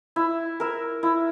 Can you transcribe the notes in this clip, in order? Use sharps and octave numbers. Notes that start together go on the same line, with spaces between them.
E4
A#4 E5
E4